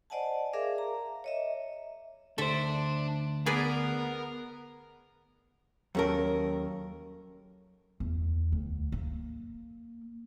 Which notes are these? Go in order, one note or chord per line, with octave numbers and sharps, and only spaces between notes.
C5 D5 D#5 F#5 G#5 A5
G#4 A#4 D5 E5 F5 D6
A#5
C#5 D#5 E5
D2 D4 A4 C5 E5
B3 G#4 A#4 B4 D5
D#2 F#3 C#4 A4 A#4 A5
E2
D2
A#3